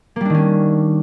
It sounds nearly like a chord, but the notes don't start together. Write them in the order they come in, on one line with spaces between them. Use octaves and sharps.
A#3 G3 D4 D#3 C#4